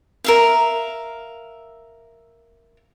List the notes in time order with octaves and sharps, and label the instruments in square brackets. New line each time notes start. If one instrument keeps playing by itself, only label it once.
[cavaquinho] A#4 E5 F5